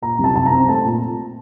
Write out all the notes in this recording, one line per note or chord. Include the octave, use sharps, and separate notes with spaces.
A#2 A#5
C2
A5
C2 A5
A#5
C4
A3 A5
A#2